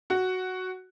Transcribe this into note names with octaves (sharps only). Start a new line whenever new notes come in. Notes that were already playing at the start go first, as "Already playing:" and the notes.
F#4